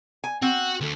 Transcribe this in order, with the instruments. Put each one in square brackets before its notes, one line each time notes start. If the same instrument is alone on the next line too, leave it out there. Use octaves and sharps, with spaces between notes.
[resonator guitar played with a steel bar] G#5
[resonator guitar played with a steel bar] C4 [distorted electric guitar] F#4
[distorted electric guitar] D2 A3